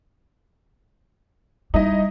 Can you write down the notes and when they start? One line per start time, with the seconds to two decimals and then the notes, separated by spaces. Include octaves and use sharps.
1.74 G3 D#4 E4 D#5